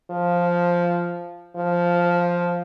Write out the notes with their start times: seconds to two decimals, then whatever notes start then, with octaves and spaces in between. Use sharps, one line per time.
0.11 F3
1.56 F3